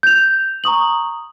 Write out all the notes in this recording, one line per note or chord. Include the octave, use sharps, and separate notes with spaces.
G6 F7
A#5 C#6 D#6 F#7